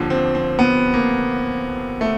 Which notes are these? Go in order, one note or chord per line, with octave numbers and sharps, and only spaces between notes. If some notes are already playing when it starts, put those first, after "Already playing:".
Already playing: D#2 D3 F3
C4
C4
B3
A#3
A3